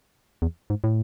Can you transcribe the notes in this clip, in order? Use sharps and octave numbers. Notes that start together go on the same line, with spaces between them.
E2
G#2
A2